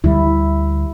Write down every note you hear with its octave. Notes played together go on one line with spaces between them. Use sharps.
D2 D3 G3 E4